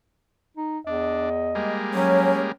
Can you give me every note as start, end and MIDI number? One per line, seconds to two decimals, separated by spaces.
0.57 0.79 63
0.87 1.59 40
0.87 1.29 62
0.87 1.77 75
1.55 2.52 55
1.55 2.52 56
1.55 2.52 58
1.94 2.37 54
1.94 2.50 61
1.94 2.37 73